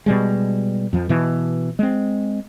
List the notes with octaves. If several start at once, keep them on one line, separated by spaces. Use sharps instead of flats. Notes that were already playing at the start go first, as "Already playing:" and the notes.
B2 G3 G#3
F2 F3
B2 E3
G#3 C4